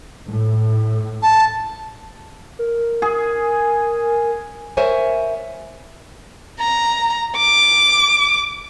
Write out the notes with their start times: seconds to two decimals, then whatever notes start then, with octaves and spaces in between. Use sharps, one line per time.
0.27 A2
1.23 A5
2.59 A#4
3.02 G#4
4.77 A#4 C5 C#5 E5 G#5
6.60 A#5
7.37 D6